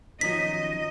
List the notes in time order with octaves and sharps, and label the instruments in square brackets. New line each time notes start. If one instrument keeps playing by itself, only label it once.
[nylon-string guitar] D#3 F3 C#4 [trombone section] F#3 B3 D#4 [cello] D#5 [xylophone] B6